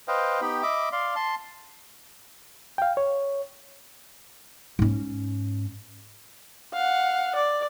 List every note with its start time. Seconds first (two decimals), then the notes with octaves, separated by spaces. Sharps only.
0.08 B4 C5 D#5 F5 G5
0.41 B3 D#4 G4 G5 B5
0.63 D#5 E5 B5 D6
0.92 D5 F5 C6
1.15 A5 C6
2.78 F5 G5
2.97 C#5
4.79 G#2 C#4
6.74 F5 F#5
7.36 D5